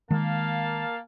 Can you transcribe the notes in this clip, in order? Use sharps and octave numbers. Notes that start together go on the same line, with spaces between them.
D#3 G#3 A#3 F5 A5